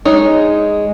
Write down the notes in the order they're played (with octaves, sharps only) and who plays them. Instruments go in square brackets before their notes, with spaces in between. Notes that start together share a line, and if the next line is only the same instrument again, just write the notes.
[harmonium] G#3 [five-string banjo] D#4 C#5